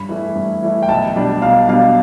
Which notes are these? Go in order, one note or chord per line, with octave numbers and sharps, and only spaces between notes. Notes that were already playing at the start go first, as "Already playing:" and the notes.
Already playing: G2 B5
E3 A3 E4
G2
E3 A3 E4
G5
B1 A5
B2 G3 D4
B1 F5
B2 G3 D4 F5